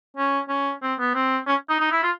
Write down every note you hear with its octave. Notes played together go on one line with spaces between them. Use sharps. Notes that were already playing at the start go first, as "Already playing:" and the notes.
C#4
C#4
C4
B3
C4
C#4
D#4
D#4
E4
F4